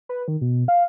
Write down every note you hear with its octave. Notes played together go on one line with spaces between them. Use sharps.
B4
D#3
B2
F5